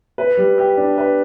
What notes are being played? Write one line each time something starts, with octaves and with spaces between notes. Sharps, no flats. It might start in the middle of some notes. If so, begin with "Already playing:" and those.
B4
G3
G4
D4
B4